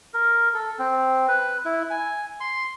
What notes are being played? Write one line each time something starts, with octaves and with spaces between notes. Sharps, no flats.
A#4
A4
C4
B4
E4
G#5
C6